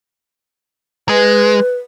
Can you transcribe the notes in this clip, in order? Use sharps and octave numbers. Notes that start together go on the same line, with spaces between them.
G#3 B4